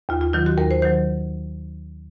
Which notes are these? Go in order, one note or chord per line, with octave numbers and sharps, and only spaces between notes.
D#2 F4
F4
D#3 F#3 F4
F#4
D#2 A#4
C5
D#3 F#3 C5